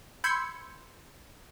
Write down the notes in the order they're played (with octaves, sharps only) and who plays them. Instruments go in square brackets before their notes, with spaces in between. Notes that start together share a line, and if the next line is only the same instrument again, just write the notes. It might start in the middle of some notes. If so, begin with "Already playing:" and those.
[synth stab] B5 C6 E6 G6 G#6 C#7